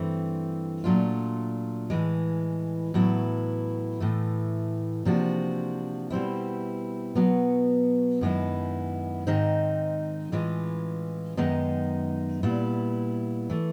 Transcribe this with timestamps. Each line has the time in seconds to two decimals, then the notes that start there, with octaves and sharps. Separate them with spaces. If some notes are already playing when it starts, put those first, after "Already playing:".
Already playing: G2 E3 A3 C4
0.84 A#2 F#3 A3 D4 F4
1.90 A2 E3 G#3
2.94 A2 F#3 B3 E4
4.00 A2 E3 A3
5.05 C3 F3 A#3 D4 F#4
6.10 B2 G3 C4 E4
7.15 B2 F#3 B3
8.21 F#2 D#3 G#3 B3 E4
9.27 G#2 D#3 G#3 C4 D#4
10.32 A2 E3 G#3 C#4 F4
11.37 F#2 D#3 G#3 B3 D#4
12.43 A#2 G3 B3 E4
13.50 E3 A3